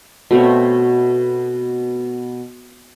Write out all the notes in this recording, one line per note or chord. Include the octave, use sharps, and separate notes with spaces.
B2 A3 C4 C#5